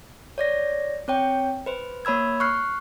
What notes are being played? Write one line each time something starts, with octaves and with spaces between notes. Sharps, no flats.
C#5 D5 A#6
C4 C#5 G5
B4 C5
A#3 C#5 B5 E6 G#6
C#6 F6 F#6 C7